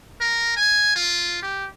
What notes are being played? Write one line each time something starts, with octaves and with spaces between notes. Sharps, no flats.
A#4
G#5
F4
G4